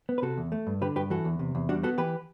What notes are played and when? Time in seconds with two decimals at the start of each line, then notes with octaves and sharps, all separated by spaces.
0.09 B3
0.18 B4
0.22 C3 F#4 A4
0.38 E2
0.52 A3
0.67 G2
0.81 D3 G4 B4
0.96 G2 G4 B4
1.10 E3 F#4 A4
1.25 E2
1.39 C3
1.55 E2
1.69 G3 D4 F#4
1.83 B3 F#4 A4
1.98 E3 G4 B4